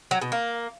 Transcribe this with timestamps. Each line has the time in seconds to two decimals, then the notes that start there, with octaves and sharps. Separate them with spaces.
0.11 F#3
0.21 B2
0.32 A#3